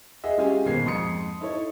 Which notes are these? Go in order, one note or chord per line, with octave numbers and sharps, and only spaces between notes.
G#4 D#5 E5 F#5
G#3 C#4 F4 G4 G#4 G#5
G#1 B2 A#3 G#6 C7
F2 G#2 C6 D#6 C#7
D#4 E4 A4 C#5